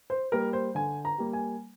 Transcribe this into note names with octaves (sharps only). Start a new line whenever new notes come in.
C5
G3 A#3 A#4
C5
D3 G#5
A#5
G3 A#3
G#5